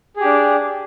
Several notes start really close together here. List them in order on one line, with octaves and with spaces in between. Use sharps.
G#4 G4 D4